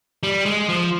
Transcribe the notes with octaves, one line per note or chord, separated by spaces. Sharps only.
G3
G#3
F3